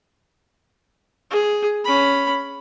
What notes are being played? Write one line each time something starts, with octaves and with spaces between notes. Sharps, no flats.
G#4
C#4 B5